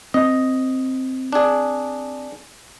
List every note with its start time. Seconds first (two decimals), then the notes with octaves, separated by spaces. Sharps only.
0.14 C4 D#5
1.33 D4 G#4